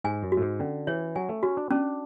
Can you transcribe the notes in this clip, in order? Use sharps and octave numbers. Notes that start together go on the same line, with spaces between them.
G#2 G#5
F#2
F#4
A2
G#2
D3 C#4
E3 C#5
F#3 G#5
A3
C#4 F#4
D4
C#4 D4